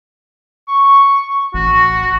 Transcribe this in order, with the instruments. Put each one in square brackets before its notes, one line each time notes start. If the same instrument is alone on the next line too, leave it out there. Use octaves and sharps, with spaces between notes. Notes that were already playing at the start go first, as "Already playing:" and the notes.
[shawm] C#6
[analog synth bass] A1 [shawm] F#4